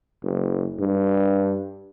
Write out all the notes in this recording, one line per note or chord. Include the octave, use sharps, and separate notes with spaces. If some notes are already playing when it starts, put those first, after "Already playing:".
F#1
G2